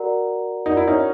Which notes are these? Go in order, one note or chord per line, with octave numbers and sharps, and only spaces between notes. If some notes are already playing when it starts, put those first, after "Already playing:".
Already playing: F#4 A#4 D5 F#5 A#5
D#4 F#4 A#4 D5 F#5 A#5
E4
C#4 D#4